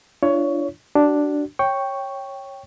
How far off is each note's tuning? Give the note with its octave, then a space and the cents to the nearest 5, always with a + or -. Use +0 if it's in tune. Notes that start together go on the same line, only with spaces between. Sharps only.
D4 +0 F4 -35 C#5 +15
D4 +0 F#4 +35
C#5 -10 G5 +0 C#6 +0